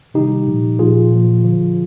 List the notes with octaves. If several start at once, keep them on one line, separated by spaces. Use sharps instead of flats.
C3 D#3 G3 D#4 G4
A#2 F3
A#2 F3 F4 G#4
A#2 F3
D3 F3